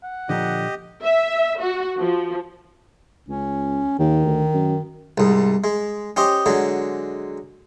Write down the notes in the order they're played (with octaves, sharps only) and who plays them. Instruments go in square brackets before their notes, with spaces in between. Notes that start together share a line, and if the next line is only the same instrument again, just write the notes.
[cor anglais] F#5
[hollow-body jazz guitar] A#2 D3 [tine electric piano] F3 [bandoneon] G4 D#5
[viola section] E5
F#4
F3
[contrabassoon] C#2 [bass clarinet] C#4
[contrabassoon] D#2 [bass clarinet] D#3
[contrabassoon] D2
F#2
[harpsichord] C2 G#2
G#3
C#4 G4 C5 D#5
D3 F#3 G#3